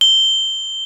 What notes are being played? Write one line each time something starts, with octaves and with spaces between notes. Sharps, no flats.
G7